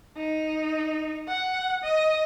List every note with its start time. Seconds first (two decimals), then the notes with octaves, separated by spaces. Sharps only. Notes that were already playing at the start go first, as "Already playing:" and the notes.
0.17 D#4
1.28 F#5
1.84 D#5